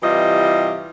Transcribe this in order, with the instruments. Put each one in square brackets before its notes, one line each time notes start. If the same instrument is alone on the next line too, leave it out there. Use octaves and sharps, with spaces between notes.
[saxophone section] C3 E3 G3 E4 F4 D#5